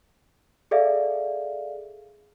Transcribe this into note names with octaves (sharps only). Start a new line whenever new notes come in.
G#4 A4 D5 E5 F5